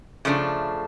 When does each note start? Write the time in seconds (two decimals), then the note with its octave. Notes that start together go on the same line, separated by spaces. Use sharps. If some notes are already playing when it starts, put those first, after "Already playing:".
0.25 C#3 F3 A3 D4